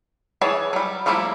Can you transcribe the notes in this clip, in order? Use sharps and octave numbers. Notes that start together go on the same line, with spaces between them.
E3 G#4 C#5 A5
F#3 G3
F3 G3 A3 A#3 E4